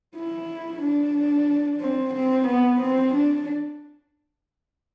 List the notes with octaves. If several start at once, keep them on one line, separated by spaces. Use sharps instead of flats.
E4
D4
C4
C4
B3
C4
D4